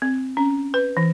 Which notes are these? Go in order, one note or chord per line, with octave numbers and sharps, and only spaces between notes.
C4
C#4
B4
E3